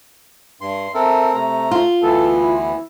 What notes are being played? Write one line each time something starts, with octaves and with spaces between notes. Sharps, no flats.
G2 C6
C4 A4 A#4 E5
C3 A3 A#5
F4
D2 E3 B3 A4
E4